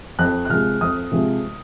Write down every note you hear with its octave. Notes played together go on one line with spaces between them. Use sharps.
F2 F#6
F#6
C3 F3 G#3 F6
F2 D#6
C3 F3 G#3